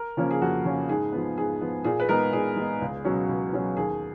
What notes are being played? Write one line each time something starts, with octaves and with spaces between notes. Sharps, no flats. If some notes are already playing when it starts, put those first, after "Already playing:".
Already playing: A#4
C#3 F3 A#3 C#4
G#4
F2 F#4
C#3 F3 A#3 C#4
G#2 G#4
F3 B3
G#2 G#4
F3 B3
A#2 G#4
B4
G#3 B3 D#4 A#4
A#2 G#4
G#3 B3 D#4
C#2
B2 F#3 C#4
C#2
B2 F#3 C#4
D#2 G#4